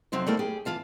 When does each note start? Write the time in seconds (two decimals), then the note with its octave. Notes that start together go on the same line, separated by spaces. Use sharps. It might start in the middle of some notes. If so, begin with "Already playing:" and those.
0.12 F2 C3 F#3 C4 B4 C5
0.26 G3 A3 A#3 E4
0.39 G4 G#4
0.65 E3 F4 F5 A5